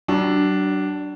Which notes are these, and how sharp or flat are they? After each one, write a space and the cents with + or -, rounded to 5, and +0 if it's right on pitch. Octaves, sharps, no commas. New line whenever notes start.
F#3 +40 D4 +0